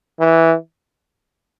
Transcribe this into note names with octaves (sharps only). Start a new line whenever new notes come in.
E3